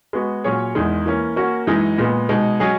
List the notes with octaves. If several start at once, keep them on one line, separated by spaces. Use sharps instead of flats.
G#3 B3 F#4
A#2 F#3 C#4 G#4 C#5
E2 D#3 G#3
E3 A#3 C#4
A#3 C#4 F#4
F#2 E3 G#3 D#4
A#2 G#3 B3
B2 G#3 D#4
F#3 C#4 G#4 D#5